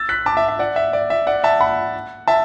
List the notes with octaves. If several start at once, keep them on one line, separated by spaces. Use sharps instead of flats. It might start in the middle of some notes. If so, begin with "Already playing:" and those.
Already playing: E6 A6
F#6 B6
A5 D6
E5
E5
D5 F#5
E5
D5
E5
D5 F#5
E5 A5
F#5 B5
E5 A5